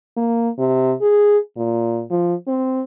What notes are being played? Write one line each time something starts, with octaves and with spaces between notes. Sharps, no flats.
A#3
C3
G#4
A#2
F3
C4